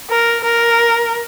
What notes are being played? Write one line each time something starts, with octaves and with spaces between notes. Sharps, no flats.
A#4
A#4